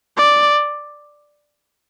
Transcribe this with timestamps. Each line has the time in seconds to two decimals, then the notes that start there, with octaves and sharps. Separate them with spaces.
0.18 D5